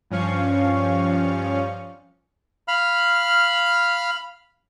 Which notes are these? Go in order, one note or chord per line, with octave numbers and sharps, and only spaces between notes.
G2 F3 C#4 F5 C#6
F5 B5 F6